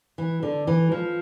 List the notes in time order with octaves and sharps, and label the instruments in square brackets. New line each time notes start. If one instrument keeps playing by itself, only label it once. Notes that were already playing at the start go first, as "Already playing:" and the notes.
[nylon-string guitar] E3
D3
E3
F3